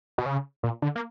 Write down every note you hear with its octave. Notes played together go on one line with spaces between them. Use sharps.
B2
C#3
A#2
D3
A#3